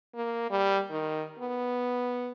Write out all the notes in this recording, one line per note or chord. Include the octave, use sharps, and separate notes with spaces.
A#3
G3
D#3
B3